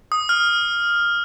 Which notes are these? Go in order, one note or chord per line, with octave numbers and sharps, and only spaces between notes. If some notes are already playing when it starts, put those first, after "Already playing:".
D#6
F6